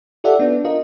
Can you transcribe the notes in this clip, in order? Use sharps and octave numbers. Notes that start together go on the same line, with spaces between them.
F4 G4 A4 D5 E5 F#5
B3 D4
F4 A#4 D#5